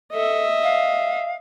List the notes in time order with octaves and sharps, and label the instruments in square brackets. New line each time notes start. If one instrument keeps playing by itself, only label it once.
[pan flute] A4 [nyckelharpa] D#5 E5
[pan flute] F5